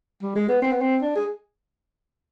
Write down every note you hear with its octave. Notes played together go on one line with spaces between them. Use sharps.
G3
G#3
B3
C4
B3
C4
D4
G#4